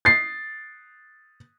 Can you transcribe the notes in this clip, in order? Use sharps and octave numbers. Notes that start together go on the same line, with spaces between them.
A6 C7